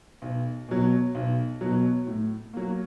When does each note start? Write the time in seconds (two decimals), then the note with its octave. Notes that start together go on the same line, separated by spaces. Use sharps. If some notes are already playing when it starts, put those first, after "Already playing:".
0.22 B1
0.69 B2 F#3
1.15 B1
1.61 B2 F#3
2.07 A2
2.54 F#3 A#3